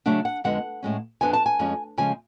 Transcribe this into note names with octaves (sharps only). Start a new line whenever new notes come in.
C#3 F#3 A3 D4 F#5
F#5
F2 D3 G#3 B3 F#5
A2 G#3 C#4
F2 F3 B3 D4 G#5
A5
G#5
F2 F3 G#3 C#4
C#3 F3 G#3 G#5